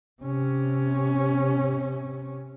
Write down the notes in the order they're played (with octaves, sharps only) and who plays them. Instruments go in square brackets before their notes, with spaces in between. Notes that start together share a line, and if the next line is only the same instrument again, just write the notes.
[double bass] C3 C#4